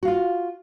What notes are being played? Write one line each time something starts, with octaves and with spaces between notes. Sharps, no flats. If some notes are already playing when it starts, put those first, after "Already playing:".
F4 F#4 F5